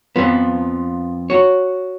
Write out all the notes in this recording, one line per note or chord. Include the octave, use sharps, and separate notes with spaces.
F2 F3 B3
F#4 C#5